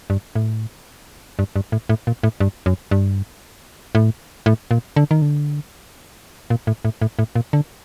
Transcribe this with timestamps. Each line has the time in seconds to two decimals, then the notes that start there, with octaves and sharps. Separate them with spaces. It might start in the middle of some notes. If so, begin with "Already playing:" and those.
0.10 G2
0.36 A2
1.39 G2
1.56 G2
1.72 A2
1.89 A2
2.07 A#2
2.23 A2
2.40 G2
2.66 F#2
2.91 G2
3.95 A2
4.46 A2
4.71 A#2
4.96 D3
5.11 D#3
5.22 D3
6.50 A#2
6.67 A2
6.85 A2
7.02 A2
7.19 A2
7.36 A#2
7.53 D3